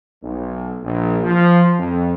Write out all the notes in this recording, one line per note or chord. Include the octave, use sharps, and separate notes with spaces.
B1
A#1
F3
F2